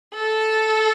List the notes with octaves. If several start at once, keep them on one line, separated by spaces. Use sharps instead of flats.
A4